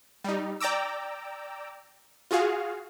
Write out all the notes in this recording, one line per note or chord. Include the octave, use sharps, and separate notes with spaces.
G3 D#4
D5 G5 A#5 D6 E6
F4 F#4 G#4 F5